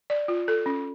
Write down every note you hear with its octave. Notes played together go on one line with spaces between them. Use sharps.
D5
F4
A4
C#4